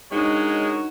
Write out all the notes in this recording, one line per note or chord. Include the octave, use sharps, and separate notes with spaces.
G#3 D4 D#4 F#4 A#4 C#5